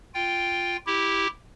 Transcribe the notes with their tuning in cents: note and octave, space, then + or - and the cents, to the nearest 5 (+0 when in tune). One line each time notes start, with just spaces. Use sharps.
F4 +0 G5 +0
E4 -5 G4 +0